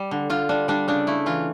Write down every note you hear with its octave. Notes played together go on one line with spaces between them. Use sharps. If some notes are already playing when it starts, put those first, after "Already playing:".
Already playing: G3
D3
D3 F4
G3 D4
G3 D4
C#3 D4
A3 E4
E3 F4